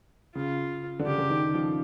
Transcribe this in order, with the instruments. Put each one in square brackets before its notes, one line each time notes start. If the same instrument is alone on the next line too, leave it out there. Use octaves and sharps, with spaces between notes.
[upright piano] C#3 [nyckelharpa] F4
[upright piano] D3
[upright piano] C#3 [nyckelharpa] G4
[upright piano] D3
D#3
F3